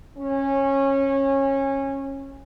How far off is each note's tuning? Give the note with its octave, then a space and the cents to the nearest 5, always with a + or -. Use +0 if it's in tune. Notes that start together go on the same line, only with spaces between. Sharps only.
C#4 -20